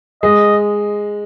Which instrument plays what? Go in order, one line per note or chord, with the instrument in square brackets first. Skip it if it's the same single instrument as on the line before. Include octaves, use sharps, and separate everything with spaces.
[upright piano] G#3 [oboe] D#5